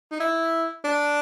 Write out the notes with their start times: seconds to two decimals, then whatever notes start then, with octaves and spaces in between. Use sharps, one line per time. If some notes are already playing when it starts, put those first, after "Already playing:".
0.12 D#4
0.20 E4
0.84 D4